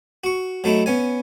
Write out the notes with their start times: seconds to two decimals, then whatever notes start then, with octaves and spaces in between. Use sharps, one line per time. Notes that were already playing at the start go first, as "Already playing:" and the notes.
0.24 F#4 C#6
0.64 F#3 A3 D#4 E4
0.86 B3 C#4 G#5